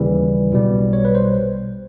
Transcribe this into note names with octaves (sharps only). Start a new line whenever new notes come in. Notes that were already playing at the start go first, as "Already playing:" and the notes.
Already playing: D#2 C#3 E3 G3
B1 B2 G3
C#5
B4
C5